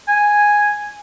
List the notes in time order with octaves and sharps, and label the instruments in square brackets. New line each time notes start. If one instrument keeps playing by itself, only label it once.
[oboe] G#5